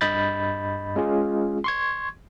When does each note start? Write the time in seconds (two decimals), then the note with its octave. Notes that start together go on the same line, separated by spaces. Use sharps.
0.01 G2 D#5 B5 G6 A6
0.96 G#3 C#4 F4 G#4
1.64 C6 C#6 G#6